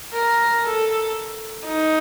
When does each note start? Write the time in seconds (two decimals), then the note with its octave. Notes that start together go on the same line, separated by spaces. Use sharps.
0.13 A#4
0.64 A4
1.66 D#4